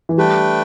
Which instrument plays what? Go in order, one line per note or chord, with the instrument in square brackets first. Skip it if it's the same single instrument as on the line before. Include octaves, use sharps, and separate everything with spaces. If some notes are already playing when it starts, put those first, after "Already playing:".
[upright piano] E3
[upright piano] G3 [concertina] A3 D4 B4 G5